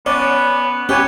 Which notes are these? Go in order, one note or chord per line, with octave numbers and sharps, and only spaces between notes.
B3 C#4 D5
B3 C#4 G4 C#5 G#5